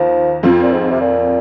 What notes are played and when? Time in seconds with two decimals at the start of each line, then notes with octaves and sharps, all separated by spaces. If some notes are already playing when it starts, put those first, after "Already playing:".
Already playing: D#2 F3
0.43 F2 F3 C4 F4
0.62 A#2
0.73 G#2
0.91 C3
1.00 A#2